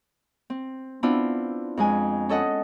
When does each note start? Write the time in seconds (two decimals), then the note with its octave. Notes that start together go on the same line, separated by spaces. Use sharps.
0.50 C4
1.03 B3 C4 D4 E4 F4
1.77 F2 G#3 G#5
2.29 C#4 A4 D#5 F#5